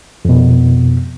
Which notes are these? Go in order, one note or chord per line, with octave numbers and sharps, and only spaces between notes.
F2 B2